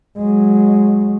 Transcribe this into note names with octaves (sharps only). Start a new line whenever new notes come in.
F#3 G#3